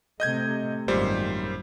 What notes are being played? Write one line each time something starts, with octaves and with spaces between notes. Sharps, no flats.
C3 A3 D#5 G6 G#6
G#1 F#2 A#2 G3 C5